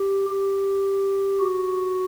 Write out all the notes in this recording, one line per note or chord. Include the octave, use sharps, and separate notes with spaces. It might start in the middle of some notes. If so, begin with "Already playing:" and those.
Already playing: G4
G4
F#4